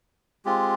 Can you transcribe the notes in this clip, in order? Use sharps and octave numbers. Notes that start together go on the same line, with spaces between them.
G#3 C4 F4 G4